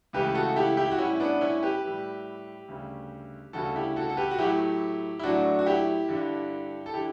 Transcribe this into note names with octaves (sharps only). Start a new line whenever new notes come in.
C#2 C#3 E3 A3 G4 B4
F#4 A4
E4 G4
E4 G4
F#4
A2 G3 C#4 E4
B3 D4
C#4 E4
G4 B4
A2 G3
D2 C#3 G3
D2 C#3 G3 F#4 A4
E4 G4
F#4 A4
A4
G4 B4
F#4
A2 F#3 A3 E4 G4
E4
A2 F#3 A3 D4 F#4
F#4
E4 G4
G2 D3 G3
A4
D3 E4 G4